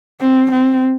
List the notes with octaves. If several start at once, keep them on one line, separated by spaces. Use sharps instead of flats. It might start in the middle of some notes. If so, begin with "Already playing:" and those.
C4
C4